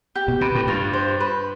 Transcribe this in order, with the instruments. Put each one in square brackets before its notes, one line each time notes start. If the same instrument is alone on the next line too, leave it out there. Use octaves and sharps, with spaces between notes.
[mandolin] G4
[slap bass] B2
[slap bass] C3 [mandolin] B4
[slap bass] A2
[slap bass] G2 [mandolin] F4
[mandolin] C5
B4